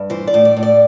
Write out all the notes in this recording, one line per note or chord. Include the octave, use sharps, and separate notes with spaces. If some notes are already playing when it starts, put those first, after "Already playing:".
Already playing: G2
E3 C5
D5
A2
D5
A2
D5